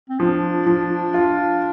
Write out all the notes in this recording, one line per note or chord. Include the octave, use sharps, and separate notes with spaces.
C4
F3 D4
F3
F4